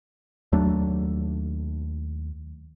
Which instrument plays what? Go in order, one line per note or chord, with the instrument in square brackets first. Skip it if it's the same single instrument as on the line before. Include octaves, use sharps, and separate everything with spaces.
[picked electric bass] D#2 F#3 A3 D4